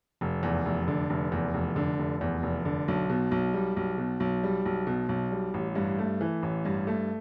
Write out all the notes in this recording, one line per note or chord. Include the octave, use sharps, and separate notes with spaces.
F1
E2
F1
D3
F1
E2
F1
D3
F1
E2
F1
D3
B1
B2
B1
G3
B1
B2
B1
G3
B1
B2
B1
G3
A1
G2
A3
E3
A1
G2
A3